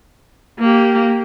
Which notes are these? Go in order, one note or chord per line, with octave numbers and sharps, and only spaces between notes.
A#3 G4